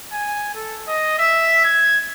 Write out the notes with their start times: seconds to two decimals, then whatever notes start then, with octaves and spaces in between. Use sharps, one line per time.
0.12 G#5
0.54 A4
0.88 D#5
1.19 E5
1.64 G#6